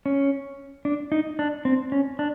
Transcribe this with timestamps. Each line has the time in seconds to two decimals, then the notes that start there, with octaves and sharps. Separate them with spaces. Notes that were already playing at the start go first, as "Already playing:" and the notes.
0.06 C#4
0.85 D4
1.12 D#4
1.39 D4
1.65 C4
1.92 C#4
2.19 D4